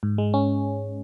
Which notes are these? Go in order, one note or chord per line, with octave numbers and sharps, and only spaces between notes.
G#2
G#3
C#4